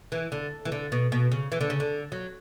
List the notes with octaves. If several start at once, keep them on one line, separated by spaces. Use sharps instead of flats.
E3
D3
E3
D3
B2
B2
C#3
E3
D3
C#3
D3
F#3